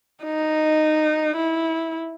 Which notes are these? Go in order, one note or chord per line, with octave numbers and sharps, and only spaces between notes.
D#4
E4